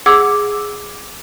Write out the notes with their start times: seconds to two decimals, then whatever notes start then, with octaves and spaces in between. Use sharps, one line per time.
0.06 G#4 F#5 D6 E6 G#6